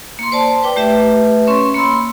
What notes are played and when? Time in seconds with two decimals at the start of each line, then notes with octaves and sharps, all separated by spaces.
0.19 A#3 C6
0.32 C5 D5 A5
0.63 B4 G5 D6
0.76 A3 G4 B4 E5
1.47 C#4 C#5 C6 C#6
1.74 A#3 B5 C6 E6